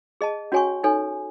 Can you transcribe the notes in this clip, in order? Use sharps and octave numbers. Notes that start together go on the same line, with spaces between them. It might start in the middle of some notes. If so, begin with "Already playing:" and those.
G#4 D#5 A5
C#4 F#4 C#5 G#5 C#6
D#4 A4 C#5 G#5